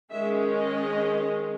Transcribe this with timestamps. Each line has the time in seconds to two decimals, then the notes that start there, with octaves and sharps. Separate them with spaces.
0.11 D#3 G#3 C#4 E5
0.57 D#5